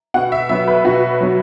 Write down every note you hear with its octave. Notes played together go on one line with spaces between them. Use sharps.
B2 F#5
E5
F#3 B3 E5
B4
B2 F#4
F#3 B3